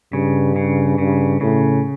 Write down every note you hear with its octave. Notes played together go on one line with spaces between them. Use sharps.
G2 C#3
C#3
G2 C#3
A2 C#3